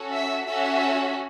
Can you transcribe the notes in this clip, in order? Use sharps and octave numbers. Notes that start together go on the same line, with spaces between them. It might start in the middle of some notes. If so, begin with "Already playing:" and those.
Already playing: C#4 F#4 A4
E5
C#4 F#4 A4 E5